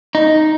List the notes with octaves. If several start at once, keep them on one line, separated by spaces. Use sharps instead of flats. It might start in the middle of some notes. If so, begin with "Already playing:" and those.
D#4